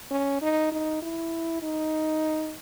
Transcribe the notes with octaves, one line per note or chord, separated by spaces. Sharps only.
C#4
D#4
D#4
E4
D#4